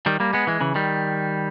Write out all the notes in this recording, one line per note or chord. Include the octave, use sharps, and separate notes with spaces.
D#3 G3
G3 A#3
G#3 B3
E3 G#3
C#3 E3
D#3 G3